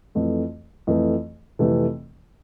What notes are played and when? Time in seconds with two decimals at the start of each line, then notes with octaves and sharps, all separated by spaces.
0.15 F2 E3 A3
0.87 F2 E3 A3
1.59 F2 C3 E3 A3